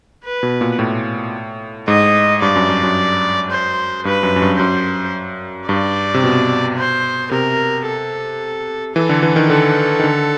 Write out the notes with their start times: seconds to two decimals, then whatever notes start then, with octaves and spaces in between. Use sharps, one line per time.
0.24 B4
0.43 B2
0.61 A#2
0.79 A2
1.88 G#2 D#5
2.42 G2 D5
2.56 F#2
2.69 G2
2.83 F#2
3.51 C5
4.05 G2 B4
4.23 F#2
4.36 F#2
4.42 G2
4.59 F#2 C5
5.69 G2 D5
6.14 C3
6.24 B2
6.78 C5
7.31 C3 A#4
7.86 A4
8.95 E3 A4
9.09 D3
9.23 E3
9.36 D#3
9.50 D3 A4
9.99 D#3
10.04 D3